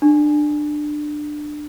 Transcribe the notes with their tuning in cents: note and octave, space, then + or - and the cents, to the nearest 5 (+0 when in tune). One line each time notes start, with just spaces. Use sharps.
D4 +20